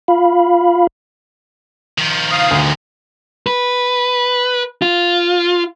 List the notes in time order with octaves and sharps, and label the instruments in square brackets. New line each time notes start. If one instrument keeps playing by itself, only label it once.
[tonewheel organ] F4 F5 B5
[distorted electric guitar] D#3 F3
[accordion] F5 D#6
[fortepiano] D2
[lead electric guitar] B4
F4